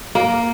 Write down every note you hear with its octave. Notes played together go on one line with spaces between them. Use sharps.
A#3